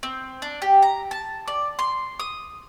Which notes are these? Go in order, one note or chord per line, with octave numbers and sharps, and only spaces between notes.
C4
D4
G4
A#5
A5
D5
C6
D#6